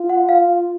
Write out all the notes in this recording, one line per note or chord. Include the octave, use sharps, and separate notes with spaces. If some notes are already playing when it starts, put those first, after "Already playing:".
Already playing: F4
F#5
F5